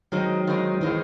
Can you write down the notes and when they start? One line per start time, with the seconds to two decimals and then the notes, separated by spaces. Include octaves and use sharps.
0.12 D#3 F#3 G#3 C4 D#4
0.47 D#3 G#3 C4 D#4
0.81 D#3 E3 G#3 C4 D#4